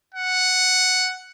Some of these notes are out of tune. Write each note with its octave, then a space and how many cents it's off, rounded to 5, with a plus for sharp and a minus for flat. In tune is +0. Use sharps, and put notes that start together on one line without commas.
F#5 +0